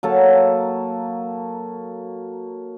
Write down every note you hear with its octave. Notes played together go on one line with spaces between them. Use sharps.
F#3 A#3 A4